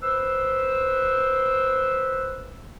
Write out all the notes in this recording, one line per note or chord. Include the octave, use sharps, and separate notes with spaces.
B4 C5 E6